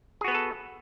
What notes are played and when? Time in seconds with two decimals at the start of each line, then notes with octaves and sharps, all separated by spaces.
0.21 G#4
0.24 F#4
0.28 B3
0.31 B4
0.35 A4